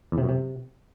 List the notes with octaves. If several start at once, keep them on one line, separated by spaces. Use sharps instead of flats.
E2
C3
F#2
C3